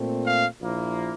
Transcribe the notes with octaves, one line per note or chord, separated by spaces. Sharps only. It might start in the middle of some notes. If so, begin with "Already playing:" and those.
Already playing: A#2 A3 C4
F5
A#1 A#2 F3 A#3 E4